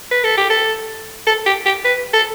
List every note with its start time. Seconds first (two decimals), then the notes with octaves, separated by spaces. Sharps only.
0.11 B4
0.24 A4
0.38 G4
0.50 A4
1.27 A4
1.46 G4
1.66 G4
1.85 B4
2.13 A4